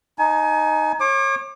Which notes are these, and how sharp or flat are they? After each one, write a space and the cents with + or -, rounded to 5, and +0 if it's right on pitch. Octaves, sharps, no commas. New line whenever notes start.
D#4 +0 G#5 +35
C#5 -35 D6 +25